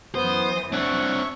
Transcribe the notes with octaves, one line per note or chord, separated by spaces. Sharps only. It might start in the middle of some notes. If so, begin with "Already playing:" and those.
F#2 E3 B3 C5 D#6
C4 D4 C#5 E5 F#5 C#6